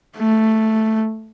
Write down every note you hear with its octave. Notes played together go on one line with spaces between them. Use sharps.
A3